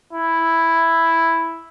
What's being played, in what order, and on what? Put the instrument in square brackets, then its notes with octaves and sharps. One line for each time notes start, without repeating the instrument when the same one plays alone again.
[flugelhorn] E4